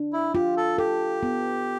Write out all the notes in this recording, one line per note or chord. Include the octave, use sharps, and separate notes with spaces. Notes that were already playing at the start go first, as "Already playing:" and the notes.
Already playing: D4
E4
F4 G4
A4
G4 A4
B3